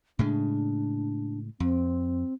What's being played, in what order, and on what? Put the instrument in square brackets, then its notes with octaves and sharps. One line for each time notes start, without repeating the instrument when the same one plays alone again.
[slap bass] A2 C#3 G#3 [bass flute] D4
[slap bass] F2 [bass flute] C4